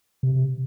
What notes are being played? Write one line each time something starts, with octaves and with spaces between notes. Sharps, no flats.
C3